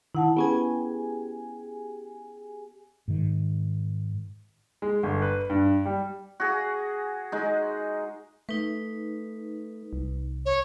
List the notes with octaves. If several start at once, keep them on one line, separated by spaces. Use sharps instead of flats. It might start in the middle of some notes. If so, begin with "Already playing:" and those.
D#3 E4 F#5 A5
B3 C#4 G4 G#4 B4 G#5
G#2 D#3
G#3
G1
B4
G2
G3
F#4 G#4
G#3 D#4
A3 D#4 B4
C2
C#5